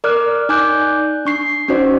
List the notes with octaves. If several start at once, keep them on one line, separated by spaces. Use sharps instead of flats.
A#4 D5 D6 F6 F#6
D#4 D5 G#5 D6 F#6 G6
D4 C#6 C7
C#4 D#4 F#4 C5 D5